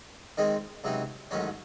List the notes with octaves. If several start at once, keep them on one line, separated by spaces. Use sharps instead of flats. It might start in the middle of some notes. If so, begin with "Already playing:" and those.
D#3 G#3 C4 D#4
C#2 C3 F#3 C4 D#4
A1 G#2 D#3 F#3 C#4